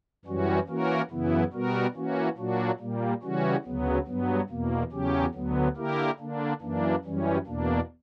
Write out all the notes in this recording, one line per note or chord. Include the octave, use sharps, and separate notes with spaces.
F#2 E3 G3 C#4 F#4
E3 A#3 C#4 F#4 A#4
F#2 C#3 E3 B3 E4
B2 G3 B3 F#4 A#4
E3 A#3 C#4 F#4
A#2 F#3 A#3 D4 F#4
A#2 G3 A#3
C#3 E3 G3 C#4 F#4
D2 C#3 F#3 B3
G2 F#3 B3
E2 B2 A#3
E2 C#3 F#3 C#4 G4
D2 D3 F#3 B3
D3 A#3 E4 G4 A#4
D3 A#3 D4
F#2 E3 A#3 D4
F#2 E3 G3 C#4
E2 B2 A#3 D4